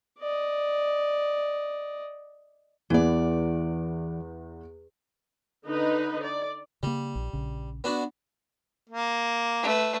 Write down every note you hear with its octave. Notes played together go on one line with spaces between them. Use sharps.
D5 D#5
E2 E3 B3 D5
D3 D#4 B4
D5
C#3 G3 A#3
A#1
A#1 C#3
B3 D4 F#4
A#3
A3 B4